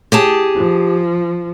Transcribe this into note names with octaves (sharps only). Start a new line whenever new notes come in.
G4 G#4 A5
F3